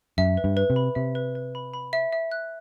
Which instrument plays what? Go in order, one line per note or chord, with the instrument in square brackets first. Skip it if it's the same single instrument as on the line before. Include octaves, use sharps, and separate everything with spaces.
[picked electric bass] F#2 [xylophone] E5
[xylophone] B4
[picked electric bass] G2
[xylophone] B4
[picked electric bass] C3
[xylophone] B5
[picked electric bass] C3 [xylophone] E5
[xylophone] B4
B4
B5
B5
E5
E5
F#6